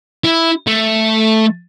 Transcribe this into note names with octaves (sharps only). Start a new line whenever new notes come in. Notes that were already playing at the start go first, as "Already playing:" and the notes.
E4
A3